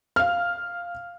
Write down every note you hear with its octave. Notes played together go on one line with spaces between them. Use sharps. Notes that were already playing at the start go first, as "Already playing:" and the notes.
F5 F6